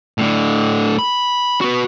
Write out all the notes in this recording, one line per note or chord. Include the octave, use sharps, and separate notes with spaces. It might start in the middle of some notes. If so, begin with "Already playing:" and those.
A2 D3
B5
F#4 B4